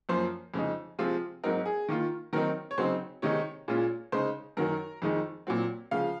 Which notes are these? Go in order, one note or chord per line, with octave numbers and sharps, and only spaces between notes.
F#2 F3 A#3 C5
F2 C#3 G#3 D#4
C3 F3 G#3 C4 F4
G#2 F#3 C4 D#4 A#4
G#4
D#3 A#3 F4
D#3 F#3 C4 D#4 A#4
C#5
C#3 F#3 C4 D#4 C5
C3 D#3 G#3 D#4 C#5
A#2 G#3 C#4 F4
C#3 G#3 D#4 C5
F#2 D#3 F#3 A#4
F2 D#3 G#3 D#4
A#2 F#3 C4
C#3 F3 G#3 F5